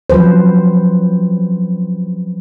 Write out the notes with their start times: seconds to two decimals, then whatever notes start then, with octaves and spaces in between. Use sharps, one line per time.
0.10 F3 F#3 B4 C5